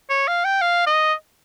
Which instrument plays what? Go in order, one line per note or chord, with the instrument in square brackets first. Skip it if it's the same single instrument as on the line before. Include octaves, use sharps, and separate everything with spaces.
[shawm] C#5
F5
G5
F5
D#5